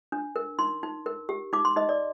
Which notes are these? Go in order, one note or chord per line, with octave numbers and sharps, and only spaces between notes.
D4
A#4
D#4 C6
D#4
A#4
G4
D#4 D6
C6
D#4 D#5
D5